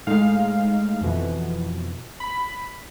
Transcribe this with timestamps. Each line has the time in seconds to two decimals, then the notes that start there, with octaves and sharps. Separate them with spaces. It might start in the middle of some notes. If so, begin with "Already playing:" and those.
0.07 A2 G#3 D#4 F5
1.01 F2 B2 E3
2.20 B5